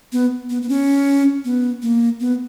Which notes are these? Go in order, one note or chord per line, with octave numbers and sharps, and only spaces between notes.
B3
B3
B3
C#4
B3
A#3
B3